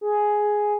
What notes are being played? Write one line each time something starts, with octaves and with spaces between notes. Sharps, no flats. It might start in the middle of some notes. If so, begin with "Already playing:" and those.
G#4